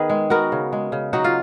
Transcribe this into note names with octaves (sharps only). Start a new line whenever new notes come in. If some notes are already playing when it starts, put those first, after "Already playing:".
Already playing: D#3 B3 G#4 B4
G#3
B3 F#4 A#4
C#3
G#3
C#3
F#3 D#4 F#4
F4